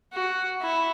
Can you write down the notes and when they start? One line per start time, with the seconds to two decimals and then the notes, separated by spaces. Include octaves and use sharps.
0.13 F#4
0.62 E4